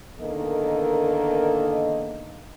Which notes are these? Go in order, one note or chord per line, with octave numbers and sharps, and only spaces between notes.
E2 D3 D#3 A#3 A4 D#5